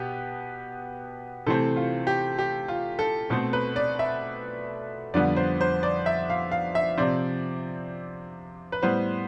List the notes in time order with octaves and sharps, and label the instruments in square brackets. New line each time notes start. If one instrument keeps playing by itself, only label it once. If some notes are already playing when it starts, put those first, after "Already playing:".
Already playing: [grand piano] B2 B3 G4
C3 E3 A3 C4 A4
F4
G4
G4
F4
A4
B2 A3 C4 A4
B4
D5
E5
F2 D3 G3 B3 D5
C5
C5
D5
E5
F5
F5
E5
C3 F3 C4 D5
B4
A2 G3 B3 C5